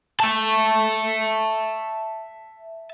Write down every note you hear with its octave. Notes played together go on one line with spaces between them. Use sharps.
E5 A5